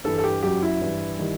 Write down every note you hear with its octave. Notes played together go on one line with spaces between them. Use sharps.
G2 E3 G3 A4
A4
G4
F#2 F#3 G4
E4
G2 E3 G3
D#3 G3